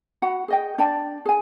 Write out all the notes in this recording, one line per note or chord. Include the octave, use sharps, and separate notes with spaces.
F#4 F#5 B5
G#4 D#5 G5
D4 D5 G5 A5
G#4 G#5